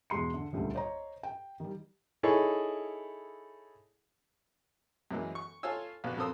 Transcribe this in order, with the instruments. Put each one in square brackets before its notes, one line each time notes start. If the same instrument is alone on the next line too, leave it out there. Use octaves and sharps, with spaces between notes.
[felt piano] E2 B2 G#3 C6 C#7
D3
D#1 C#2 D3 G3 A3
C5 C#5 D#5 A#5
G5
D#3 G3
[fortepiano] D#4 E4 G#4 A4 C#5
F#2 E3 G#3 A#3
C#6
F4 A4 C5 C#5 G#5 E6
A#1 B3 F#4
F2 A4 A#4 C5 D#6 E6